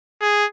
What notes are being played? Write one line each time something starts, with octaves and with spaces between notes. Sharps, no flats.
G#4